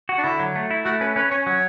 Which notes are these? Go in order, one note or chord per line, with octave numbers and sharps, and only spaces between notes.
F#4
D4
D3 E4
F#3
A3
E4
A3 F#4
C#4 B4
C#4 B4
C#4 C#5
F#3 C#5